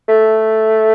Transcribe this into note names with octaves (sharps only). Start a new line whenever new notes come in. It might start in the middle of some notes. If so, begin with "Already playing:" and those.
A3